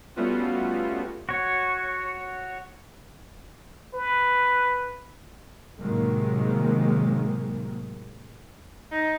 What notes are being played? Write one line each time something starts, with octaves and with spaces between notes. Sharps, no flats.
G3 A3 B3 C#4 F4 F#4
F#4 C#5
B4
A2 C3 D#3 F#3 G#3 A#3
D#4